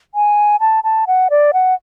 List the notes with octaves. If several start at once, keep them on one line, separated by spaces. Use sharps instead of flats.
G#5
A5
A5
F#5
D5
F#5